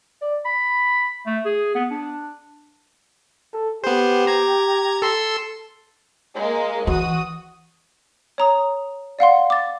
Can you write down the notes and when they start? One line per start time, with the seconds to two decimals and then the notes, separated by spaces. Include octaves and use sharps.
0.21 D5
0.45 B5
1.26 A3
1.45 G#4
1.75 B3
1.91 D4
3.53 A4
3.84 B3 G4 C5
4.27 A#5 G#6
5.02 A4 C6 E6
6.36 G#3 A#3
6.87 E3 F#4 D#6
8.38 C#5 A#5 D#6
9.19 D5 F5 F#5 C6
9.50 D6 A6